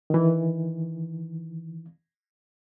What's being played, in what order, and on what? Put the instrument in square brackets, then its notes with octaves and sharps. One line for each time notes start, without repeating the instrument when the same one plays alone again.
[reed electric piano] D#3 E3